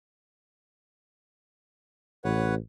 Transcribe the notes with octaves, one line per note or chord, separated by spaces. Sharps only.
A1 B4 C#5 F#5